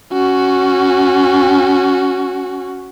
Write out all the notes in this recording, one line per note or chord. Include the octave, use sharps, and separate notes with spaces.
C#4 F#4